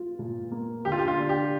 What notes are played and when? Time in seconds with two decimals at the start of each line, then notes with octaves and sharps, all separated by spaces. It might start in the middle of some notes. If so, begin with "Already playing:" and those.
Already playing: F4
0.19 A#2
0.51 A#3
0.85 D3 G4
0.92 F4
0.99 G4
1.08 F4
1.18 D4
1.29 G4